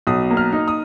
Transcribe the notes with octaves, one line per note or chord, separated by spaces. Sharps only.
B1 D#6
A#3
F6
D#4
D#6